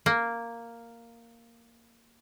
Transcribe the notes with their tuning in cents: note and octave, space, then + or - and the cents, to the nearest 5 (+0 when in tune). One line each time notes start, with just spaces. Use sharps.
A#3 -5